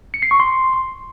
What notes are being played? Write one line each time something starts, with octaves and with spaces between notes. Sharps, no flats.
C#7
C7
C#6
C6